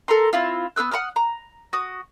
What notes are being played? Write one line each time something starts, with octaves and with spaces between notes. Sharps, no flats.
A4 A#4 A#5 C6
C4 E4 F4
B3 C5 E6 F#6
F#5 A#5 D#6 F6
A#5
F#4 D#6